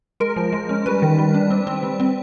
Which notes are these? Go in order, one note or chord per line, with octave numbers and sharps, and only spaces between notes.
G#3 A#4
F3
G#3
C#4
G3 B4
D#3
G3
D4
C4
C4
G3
C4